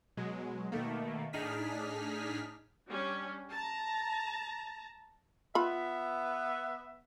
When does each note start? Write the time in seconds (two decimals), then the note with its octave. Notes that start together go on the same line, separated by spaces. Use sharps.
0.17 B2 F#3 G#3
0.72 B2 D#3 A3 A#3
1.33 A2 D4 D#4 G#4 F6 B6
2.89 G3 C#4 D4
3.51 A5 A#5
5.55 B3 F4 E5 B5